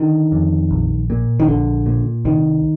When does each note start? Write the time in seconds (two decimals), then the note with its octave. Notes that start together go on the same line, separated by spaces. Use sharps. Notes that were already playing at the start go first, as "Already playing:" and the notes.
Already playing: D3 D#3
0.32 F2
0.71 A#1
1.10 A#2
1.40 D#3
1.48 A#1 D3
1.86 A#2
2.25 C2 D#3